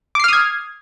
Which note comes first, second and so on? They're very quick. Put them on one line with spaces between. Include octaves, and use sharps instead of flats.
D6 C7 F6 D#6 G#6